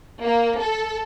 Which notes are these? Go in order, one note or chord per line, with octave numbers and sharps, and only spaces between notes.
A#3
A4